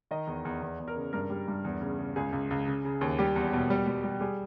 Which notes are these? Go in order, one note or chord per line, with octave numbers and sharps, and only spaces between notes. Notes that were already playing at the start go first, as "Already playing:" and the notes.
D#3 D#5
E2
E2
E2
E2
A#4
C#3
G2 A#4
G3
G2
E2
C#3
C#3
C#2 G#4
C#2
C#2
C#3
C#3
D#2
G3 G4
E2
B2
G3
G3
G3
G3 G#4